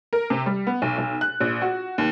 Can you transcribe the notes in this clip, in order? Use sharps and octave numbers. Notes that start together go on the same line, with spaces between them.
A#4
C3
G3
B3
B1
B1
F#6
A#1
F#4
D#2